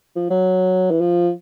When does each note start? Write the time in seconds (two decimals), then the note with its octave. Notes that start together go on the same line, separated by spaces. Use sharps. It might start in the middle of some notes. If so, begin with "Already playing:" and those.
0.16 F3
0.30 F#3
0.91 E3
1.00 F3